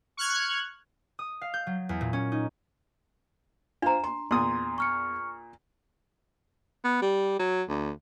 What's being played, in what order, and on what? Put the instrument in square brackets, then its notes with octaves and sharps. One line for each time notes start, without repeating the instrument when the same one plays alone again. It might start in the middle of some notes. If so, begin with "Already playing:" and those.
[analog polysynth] C#6 F6 F#6 G#6
[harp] D#6
F5
G6
F#3
E2
A#2
C#4
D#4
[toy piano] D4 A#5 [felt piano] F4 C5
[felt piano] C6
[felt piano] E2 [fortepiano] A#2 D#6 [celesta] C6
[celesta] C#6 F6 C#7
[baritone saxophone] B3
G3
F#3
D2